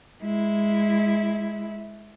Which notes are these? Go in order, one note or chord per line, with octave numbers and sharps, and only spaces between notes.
G#3 E4